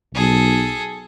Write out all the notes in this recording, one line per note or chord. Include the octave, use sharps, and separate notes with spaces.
B1 G#4 A4